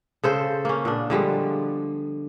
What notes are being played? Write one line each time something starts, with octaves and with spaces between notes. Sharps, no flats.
C#3 A4 C5
A#3 C#4
A#2 B3 D4
D3 F3 G3 G#3